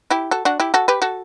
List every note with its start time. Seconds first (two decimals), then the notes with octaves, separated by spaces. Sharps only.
0.10 E4 G4
0.31 F#4 A4
0.45 D4 F#4
0.60 E4 G4
0.74 F#4 A4
0.88 G4 B4
1.02 F#4 A4